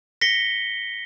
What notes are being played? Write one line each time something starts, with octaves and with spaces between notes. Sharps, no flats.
A#6 B6 C#7 G7